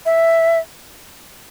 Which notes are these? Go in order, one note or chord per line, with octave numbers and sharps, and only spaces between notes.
E5